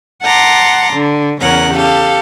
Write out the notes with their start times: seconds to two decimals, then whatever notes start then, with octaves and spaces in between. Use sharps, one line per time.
0.23 F#5 A5 A#5 C6 D6
0.93 D3
1.40 E2 C#3 C#4 A#4 F#5
1.73 G4 A4 F5